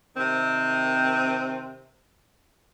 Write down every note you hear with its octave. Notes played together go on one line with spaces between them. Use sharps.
C3 D#3 C4